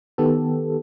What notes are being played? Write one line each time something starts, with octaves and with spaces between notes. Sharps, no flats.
D#3 B3 G4 A4